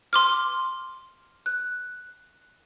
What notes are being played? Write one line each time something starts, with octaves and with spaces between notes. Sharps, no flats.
C6 D6 F6
F#6